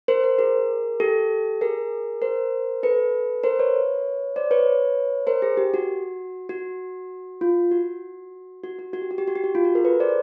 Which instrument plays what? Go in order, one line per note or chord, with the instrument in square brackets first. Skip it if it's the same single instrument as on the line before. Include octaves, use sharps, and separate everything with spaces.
[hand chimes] A#4 C5
A#4 C5
G#4 A#4
G4 A4
G#4 A#4
A#4 C5
A4 B4
A#4 C5
B4 C#5
C5 D5
B4 C#5
A#4 C5
G#4
G4
F#4
F#4
F4
F#4
F#4
F#4
F#4
G4
F#4
G4
F#4
G4
F#4
F4
F#4
G#4 A#4
A4 B4
C5 D5